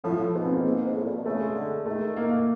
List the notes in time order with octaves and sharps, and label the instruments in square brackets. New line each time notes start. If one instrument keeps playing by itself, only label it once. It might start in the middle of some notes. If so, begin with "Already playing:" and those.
[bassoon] A2 [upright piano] F3
[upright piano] F3
[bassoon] G#2 [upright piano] B3
[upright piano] C4
A#3
[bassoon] G#2
G#2
A2
A#2
B2
[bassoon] C#3 [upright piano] A3
[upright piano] G#3
[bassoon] D3
[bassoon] D#3 [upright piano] A3
[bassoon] D#3
[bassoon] D#3 [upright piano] A#3
[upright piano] A#3